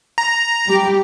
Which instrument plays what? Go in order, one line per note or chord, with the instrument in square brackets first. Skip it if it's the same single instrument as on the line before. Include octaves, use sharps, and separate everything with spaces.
[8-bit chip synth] A#5
[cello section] G3 G4